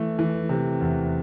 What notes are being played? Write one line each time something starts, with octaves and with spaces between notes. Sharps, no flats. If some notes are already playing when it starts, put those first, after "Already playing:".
Already playing: E3 A3
E3
C3
E2